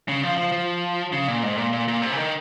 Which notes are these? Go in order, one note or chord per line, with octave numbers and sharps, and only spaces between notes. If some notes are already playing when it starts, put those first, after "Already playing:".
C#3
F3
F3
F3
C#3
A#2
G#2
A#2
A#2
A#2
C3
C#3
D#3